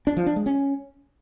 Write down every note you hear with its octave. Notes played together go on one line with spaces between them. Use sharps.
D4
F3
D4
G#3
C#4